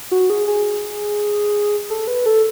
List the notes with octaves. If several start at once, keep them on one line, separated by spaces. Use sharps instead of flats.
F#4
G#4
G#4
A4
B4
A4